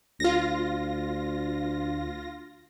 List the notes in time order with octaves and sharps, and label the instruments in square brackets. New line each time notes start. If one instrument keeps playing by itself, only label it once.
[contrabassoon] D2 [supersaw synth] F4 A#6